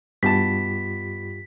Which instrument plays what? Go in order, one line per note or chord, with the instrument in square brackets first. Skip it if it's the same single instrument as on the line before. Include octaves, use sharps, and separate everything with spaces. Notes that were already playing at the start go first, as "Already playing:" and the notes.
[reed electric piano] G2 F4 G4 [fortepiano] B2 A5 [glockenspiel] B6